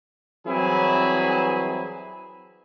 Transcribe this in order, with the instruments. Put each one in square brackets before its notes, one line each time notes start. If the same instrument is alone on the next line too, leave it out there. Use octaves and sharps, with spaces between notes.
[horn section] E3 F#3 G3 C4 E4 G#4